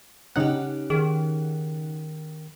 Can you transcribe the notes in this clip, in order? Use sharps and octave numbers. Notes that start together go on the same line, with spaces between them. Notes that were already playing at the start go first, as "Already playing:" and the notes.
C#3 C#4 D#4 G4 F#5
D#3 G#4